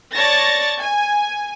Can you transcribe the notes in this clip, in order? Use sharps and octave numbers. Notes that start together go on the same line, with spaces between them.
C#5 D5 A5 C#6 A6 A#6
G#5